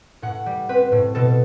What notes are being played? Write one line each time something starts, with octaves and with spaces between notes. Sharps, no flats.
A2 F#5
G3
C4 B4
A2
B2 A4